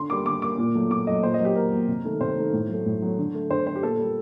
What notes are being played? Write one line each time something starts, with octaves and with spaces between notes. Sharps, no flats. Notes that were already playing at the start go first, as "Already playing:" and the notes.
Already playing: D3 C6
G3 A#3 D6
D3 D6
G3 A#3 D6
A#2
F#3 A3
A#2 D6
F#3 A3 D#5
A#2 C5
D#5
F#3 A#3
G4
A#2 A#4
F#3 A#3
C3
D#3 A3
C3 C5
D#3 A3
A2
F#3 A3
A2
F#3 A3
D3
A3
D3 C5
A3 C5
G4
A#2 A4
G3 A#3